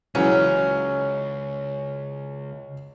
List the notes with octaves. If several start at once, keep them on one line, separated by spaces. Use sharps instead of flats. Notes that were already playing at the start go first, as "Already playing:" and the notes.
C#2 C#3 E3 F#3 C#4